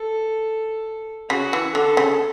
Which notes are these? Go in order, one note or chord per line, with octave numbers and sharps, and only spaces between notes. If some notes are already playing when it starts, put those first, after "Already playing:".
Already playing: A4
C#3 F#4
E3
D3 A4
C#3